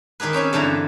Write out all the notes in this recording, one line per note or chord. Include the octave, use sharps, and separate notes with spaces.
D#3 D#4 G4 G#4 B4
C4 C#4 D#4 G#5
G2 D3 E3 G3 A#5